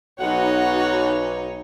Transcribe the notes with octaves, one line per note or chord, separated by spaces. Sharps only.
B1 D#4 F#4 C#5 F#5